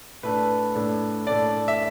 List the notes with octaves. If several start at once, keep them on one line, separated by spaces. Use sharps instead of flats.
A2 A3 D4 B4
A2 A3 D4
A2 A3 D4 D5
E5